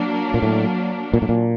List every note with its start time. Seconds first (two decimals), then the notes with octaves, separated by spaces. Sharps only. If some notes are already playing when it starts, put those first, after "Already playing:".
Already playing: F#3 A#3 D4
0.34 A#2
0.42 A2
1.14 A#2
1.22 A2
1.29 A#2